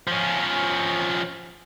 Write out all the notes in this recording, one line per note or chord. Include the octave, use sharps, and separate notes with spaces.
F3 C#4